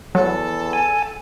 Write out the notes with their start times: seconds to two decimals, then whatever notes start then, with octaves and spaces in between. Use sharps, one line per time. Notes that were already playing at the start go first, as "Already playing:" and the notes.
0.15 E2 F#3 A4
0.73 G#5